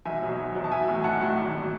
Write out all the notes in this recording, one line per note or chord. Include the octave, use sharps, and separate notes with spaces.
B1 E5 G#5
B2 F#3
B1
B2 F#3
A5
B1 E5 G#5
A2 F#3
B1 F#5 A5
A2 F#3
G#1
F#3